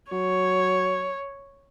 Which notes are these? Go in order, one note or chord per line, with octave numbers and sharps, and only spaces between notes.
F#3 C#5